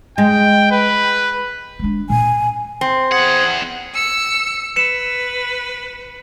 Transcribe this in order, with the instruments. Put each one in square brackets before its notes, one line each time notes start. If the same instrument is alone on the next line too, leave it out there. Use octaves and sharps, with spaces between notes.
[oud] G#3 [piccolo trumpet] G5
[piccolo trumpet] B4
[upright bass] G#3 D4
[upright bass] A#2 [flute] G#5
[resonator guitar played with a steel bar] C4
[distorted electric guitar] E2 F#5 [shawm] G#4
[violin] E6 C#7
[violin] B4 [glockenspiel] C#7 E7